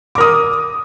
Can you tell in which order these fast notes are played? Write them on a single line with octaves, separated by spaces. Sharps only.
D6 A#4 D#6